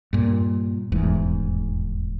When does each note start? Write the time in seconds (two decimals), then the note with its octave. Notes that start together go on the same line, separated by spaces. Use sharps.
0.13 G2 A#2
0.92 D#1 E2 G#2